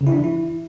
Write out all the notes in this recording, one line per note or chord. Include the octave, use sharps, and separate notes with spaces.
C#3
E4
D4
E3
E4